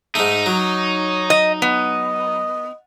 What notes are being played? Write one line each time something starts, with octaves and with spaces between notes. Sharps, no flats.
G#2 A3 D#4
F#3 C#5
D#5
B3 D#5